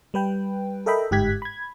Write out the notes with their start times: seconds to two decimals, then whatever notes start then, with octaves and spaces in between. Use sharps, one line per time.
0.14 G3 B4 G5
0.86 A4 A#4 D#5 E5 G5 B5
1.11 G1 G#2 G4 F#6 G#6 B6
1.42 B5 G#6